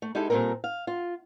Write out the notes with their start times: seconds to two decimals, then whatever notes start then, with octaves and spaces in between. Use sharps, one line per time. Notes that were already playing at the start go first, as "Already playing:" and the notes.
0.02 A3
0.15 G#3 D#4 E4 G4 A4
0.30 A#2 G3 A#3 C4 A4 A#4
0.64 F5
0.87 F4